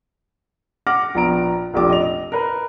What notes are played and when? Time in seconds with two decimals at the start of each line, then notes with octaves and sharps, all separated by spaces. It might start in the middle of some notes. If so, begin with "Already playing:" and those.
0.87 F#5 D6 F6 A#6
1.15 A#1 B3 A#5 D7
1.73 F1 A#1 G4 D6
1.89 D#5 F7
2.32 A#4 B4